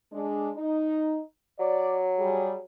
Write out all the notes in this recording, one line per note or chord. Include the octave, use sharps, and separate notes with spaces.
G#3 D4
D#4
F#3 D5
G3 G#4